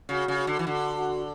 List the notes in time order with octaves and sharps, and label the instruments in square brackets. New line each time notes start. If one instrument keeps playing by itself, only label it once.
[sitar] C#3 [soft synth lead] F#4
[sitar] C#3
[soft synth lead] F#4
[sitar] D3
E3
[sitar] D3 [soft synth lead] F#4
[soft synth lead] F#4